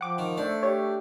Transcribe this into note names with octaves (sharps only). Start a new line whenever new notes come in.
F3 F#5 G5 D6
D#3 C#6
A3 D4 C5
G4 C#5